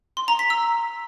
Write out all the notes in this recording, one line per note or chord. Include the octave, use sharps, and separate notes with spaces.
C6
A#5
B6
E6